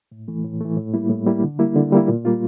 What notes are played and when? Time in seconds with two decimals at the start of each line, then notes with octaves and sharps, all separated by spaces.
0.12 A2
0.28 E3 A3
0.44 A2
0.61 E3 A3
0.77 A2
0.94 G3 A#3 E4
1.10 A2
1.26 G3 A#3 E4
1.43 D3
1.59 G3 A#3 E4
1.75 D3
1.92 G3 A#3 E4
2.08 A#2
2.25 G3 A#3 F4